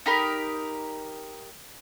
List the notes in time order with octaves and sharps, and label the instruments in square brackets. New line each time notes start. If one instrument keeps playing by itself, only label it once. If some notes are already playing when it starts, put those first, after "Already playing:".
[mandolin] D#4 G4 A#4 B5